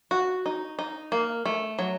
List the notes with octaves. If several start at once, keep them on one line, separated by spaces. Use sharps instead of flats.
F#4
D#4
D#4
A#3
A3
F#3